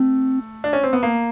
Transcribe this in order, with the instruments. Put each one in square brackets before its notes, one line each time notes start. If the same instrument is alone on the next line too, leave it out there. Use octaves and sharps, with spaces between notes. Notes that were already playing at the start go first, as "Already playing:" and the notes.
Already playing: [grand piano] A3 [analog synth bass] C4
[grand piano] D4
C#4
C4
B3
A#3